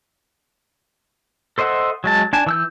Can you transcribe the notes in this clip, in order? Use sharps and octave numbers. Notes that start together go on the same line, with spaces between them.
A4 C5 D#5 E5 F#5
F#3 G#3 A5
D4 G#5 A5
E3 E6 G6